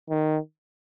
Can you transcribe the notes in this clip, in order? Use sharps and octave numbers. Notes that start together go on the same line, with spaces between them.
D#3